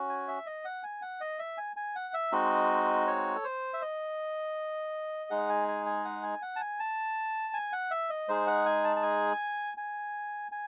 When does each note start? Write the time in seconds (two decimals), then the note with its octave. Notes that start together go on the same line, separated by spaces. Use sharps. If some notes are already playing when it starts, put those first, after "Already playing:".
Already playing: C#4 F#4
0.09 G#5
0.28 E5
0.46 D#5
0.65 F#5
0.83 G#5
1.02 F#5
1.21 D#5
1.39 E5
1.58 G#5
1.76 G#5
1.95 F#5
2.14 E5
2.32 G#3 C4 D#4 F#4 D#5
3.07 C#5
3.36 A4
3.44 C5
3.74 E5
3.82 D#5
5.30 G#3 D#4 G#4 F#5
5.49 G#5
5.68 G#5
5.86 G#5
6.05 F#5
6.23 G#5
6.42 F#5
6.56 A5
6.60 G#5
6.80 A5
7.54 G#5
7.73 F#5
7.91 E5
8.10 D#5
8.28 G#3 D#4 G#4 C5
8.47 F#5
8.66 G#5
8.84 A5
8.96 A5
9.03 G#5
9.77 G#5
10.52 G#5